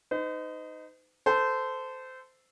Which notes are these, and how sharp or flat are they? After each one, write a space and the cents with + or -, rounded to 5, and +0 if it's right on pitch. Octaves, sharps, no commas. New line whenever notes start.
D#4 +0 C5 -45
A4 +0 C5 -20